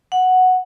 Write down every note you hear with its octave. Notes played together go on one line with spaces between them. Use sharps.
F#5